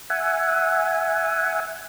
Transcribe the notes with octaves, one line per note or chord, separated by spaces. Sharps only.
E5 F#5 G#5